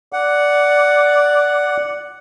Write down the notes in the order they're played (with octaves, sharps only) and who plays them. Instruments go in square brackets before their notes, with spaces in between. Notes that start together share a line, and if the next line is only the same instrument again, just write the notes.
[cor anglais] D5 [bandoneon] F#5